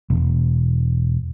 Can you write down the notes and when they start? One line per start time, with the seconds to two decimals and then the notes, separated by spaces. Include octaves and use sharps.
0.10 E1